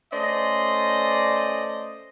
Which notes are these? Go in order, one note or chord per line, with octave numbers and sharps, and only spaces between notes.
A3 C#4 C5 D5 D#5